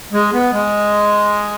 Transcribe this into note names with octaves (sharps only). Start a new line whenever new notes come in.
G#3
B3
G#3